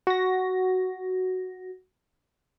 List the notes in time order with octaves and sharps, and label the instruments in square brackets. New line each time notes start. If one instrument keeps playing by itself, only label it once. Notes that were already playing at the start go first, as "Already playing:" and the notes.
[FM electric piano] F#4 A#6